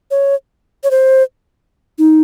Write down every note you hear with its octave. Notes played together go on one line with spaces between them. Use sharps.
C#5
C#5
C5
D#4